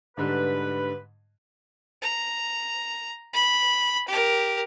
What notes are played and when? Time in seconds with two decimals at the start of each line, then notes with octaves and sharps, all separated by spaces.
0.17 G#2 D3 G3 B4
2.02 A#5
3.33 B5
4.08 G4 A#4